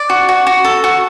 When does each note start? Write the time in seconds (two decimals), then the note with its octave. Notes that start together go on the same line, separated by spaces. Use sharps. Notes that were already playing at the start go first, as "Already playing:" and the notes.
Already playing: D5
0.10 F#4
0.29 F#4
0.47 F#4
0.64 A4
0.84 F#4